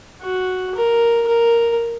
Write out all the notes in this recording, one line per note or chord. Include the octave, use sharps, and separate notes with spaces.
F#4
A#4
A#4